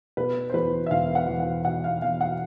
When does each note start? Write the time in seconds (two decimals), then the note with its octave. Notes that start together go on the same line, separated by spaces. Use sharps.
0.17 B2 B4
0.50 C5
0.54 E2 B4
0.86 E5
0.91 E1 F5
1.15 F#5
1.28 E2
1.40 F#5
1.65 B2 F#5
1.84 F5
2.02 E2 F5
2.21 F#5